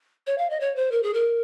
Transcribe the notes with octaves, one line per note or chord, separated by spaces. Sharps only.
C#5
F5
D#5
C#5
C5
A#4
G#4
A#4